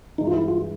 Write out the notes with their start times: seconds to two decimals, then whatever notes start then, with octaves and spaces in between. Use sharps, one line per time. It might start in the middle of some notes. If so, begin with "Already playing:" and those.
0.18 G2 E3 G#3 D#4
0.27 F4
0.34 E4
0.48 F4